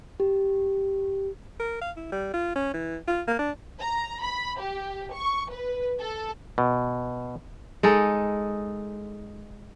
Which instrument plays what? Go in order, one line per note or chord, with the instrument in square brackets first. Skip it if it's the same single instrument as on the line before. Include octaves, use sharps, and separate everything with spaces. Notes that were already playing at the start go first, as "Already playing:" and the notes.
[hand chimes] G4
[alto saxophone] A#4
F5
E4
G3
F4
C#4
E3
F4
A#3
D4
[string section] A#5
B5
G4
C#6
B4
A4
[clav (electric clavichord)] B2
[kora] G#3 D#4 A4